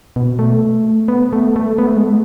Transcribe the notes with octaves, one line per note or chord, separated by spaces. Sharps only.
B2
A3
B3
A3
A3
B3
A3
G#3
A3